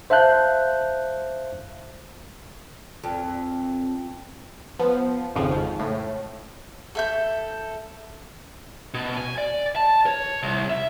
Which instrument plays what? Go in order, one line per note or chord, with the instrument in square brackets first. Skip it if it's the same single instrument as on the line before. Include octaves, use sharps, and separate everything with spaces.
[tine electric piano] C5 E5 F5 A5 F#6 G6
[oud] F2
[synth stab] F3 B3
G#1 F2 G#2 C#3 F3
A2
[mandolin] A4 E5 G6
[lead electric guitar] B2
G#5
D5
A5
C#5
C2
E5